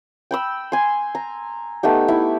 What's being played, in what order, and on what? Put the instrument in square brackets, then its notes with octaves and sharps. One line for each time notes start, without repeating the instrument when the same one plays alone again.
[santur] G5 B5 E6
G#5 C6
A#5
A3 B3 D#4 G4
E4